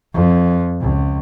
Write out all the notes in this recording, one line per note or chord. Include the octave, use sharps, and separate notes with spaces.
F2
C#2